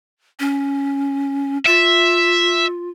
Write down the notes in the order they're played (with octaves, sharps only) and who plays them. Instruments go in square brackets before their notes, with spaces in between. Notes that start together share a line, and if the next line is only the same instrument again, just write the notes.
[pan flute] C#4
[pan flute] F4 [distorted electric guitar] E5